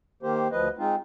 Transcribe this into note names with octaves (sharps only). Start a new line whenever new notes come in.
D#3 A#3 G4 C5
D2 F3 B4 D#5
G#3 C4 D#4 F4